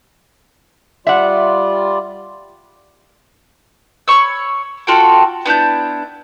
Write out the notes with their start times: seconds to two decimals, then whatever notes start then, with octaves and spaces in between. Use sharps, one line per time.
1.07 G3 F4 D5 E5 F#5
4.08 C#5 B5 C#6 E6
4.87 F4 F#4 A4 G5
5.46 B3 D4 E4 G6